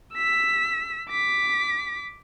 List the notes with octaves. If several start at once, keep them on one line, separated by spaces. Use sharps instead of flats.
E6 B6
D6 B6